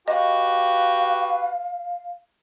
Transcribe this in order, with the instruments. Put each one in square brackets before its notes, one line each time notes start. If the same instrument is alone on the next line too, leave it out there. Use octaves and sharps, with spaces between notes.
[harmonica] F#4 G4 B4 [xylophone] D#5 [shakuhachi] F5